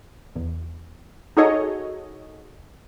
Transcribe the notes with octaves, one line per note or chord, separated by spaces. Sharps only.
E2
D#4 F#4 G#4 A4 C#5 D#5